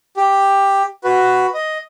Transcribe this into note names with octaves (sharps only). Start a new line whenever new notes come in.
G4
F#4 B4
D#5